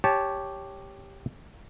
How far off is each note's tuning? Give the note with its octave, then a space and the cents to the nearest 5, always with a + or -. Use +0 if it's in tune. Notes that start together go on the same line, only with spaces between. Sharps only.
G4 +0 C#5 +0 A5 -15